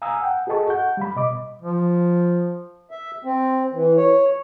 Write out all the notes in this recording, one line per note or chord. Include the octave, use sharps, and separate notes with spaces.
F5 G#5 A#5 D#6 E6
F#5 G5
F#4 G#4 A4 D#5 A5 C#6
F#5 G6
G3 F5 B5
B2 D#5 D6
F3
E5
C4
E3
C#5